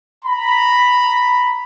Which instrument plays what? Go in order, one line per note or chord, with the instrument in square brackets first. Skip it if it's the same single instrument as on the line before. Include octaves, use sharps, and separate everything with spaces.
[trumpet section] A#5 B5